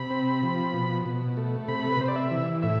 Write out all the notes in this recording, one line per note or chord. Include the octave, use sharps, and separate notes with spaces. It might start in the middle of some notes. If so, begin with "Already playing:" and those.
Already playing: C3 B5
C4
F3
B2
B2
A3
C3 B5
B4
C3 C5
D5
E5
E3
A2 E5